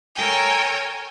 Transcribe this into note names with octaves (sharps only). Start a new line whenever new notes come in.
A4 A#4 C#5 G5 G#5